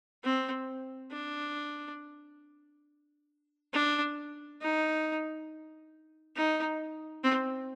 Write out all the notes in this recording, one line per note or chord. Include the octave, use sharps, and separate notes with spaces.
C4
D4
D4
D#4
D#4
C4